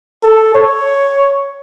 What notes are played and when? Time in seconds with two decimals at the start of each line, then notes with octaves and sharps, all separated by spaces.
0.23 A4
0.54 C#5